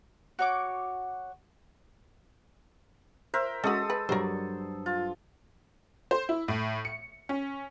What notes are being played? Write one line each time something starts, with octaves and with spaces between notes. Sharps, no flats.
F#4 C#5 D6
A#4 C5 E5
G#3 C#4 F#4 A4 D#6 E6
B4
G2 F#3 A#4 C5 D5
F4
C5
E4
A2
C#7
C#4